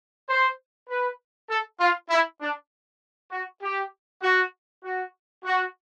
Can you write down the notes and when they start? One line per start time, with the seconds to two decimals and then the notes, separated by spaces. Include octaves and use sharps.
0.29 C5
0.89 B4
1.50 A4
1.80 F4
2.10 E4
2.41 D4
3.32 F#4
3.62 G4
4.22 F#4
4.84 F#4
5.45 F#4